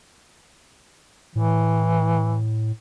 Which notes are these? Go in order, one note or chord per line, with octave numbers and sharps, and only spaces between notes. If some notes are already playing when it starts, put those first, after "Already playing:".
A2 E3